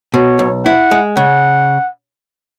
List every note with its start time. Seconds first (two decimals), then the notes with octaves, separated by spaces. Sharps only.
0.14 B2 C#5
0.39 B1
0.65 E4 F#5
0.91 G#3
1.17 C#3 F#5